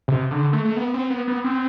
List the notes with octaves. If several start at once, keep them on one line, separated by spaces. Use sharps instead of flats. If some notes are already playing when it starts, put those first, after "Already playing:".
C3
D3
A3
A3
B3
C4
B3
B3
C4